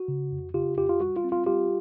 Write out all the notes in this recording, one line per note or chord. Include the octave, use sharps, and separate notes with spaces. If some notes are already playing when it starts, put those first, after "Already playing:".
Already playing: F#4
C#3
F2
C#3 F4 G4
F2 F4 G4
F4
G3 F#4
F4
C4
F4
G3 F4 G4